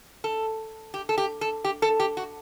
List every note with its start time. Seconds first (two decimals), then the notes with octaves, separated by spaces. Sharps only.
0.24 A4
0.94 G4
1.09 A4
1.18 G4
1.41 A4
1.65 G4
1.82 A4
2.00 G4
2.17 F#4